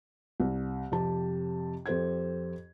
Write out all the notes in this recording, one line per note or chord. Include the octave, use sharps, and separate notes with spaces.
C2
F2 C3 G4 A5
F2 G4 A4 C5 G#6